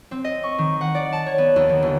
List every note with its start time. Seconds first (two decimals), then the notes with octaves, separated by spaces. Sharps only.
0.11 C4
0.24 D#5
0.43 C#6
0.58 D#3
0.81 F#5
0.95 D5
1.13 A5
1.26 C#5
1.38 B3
1.56 D#2
1.69 D#3
1.83 G1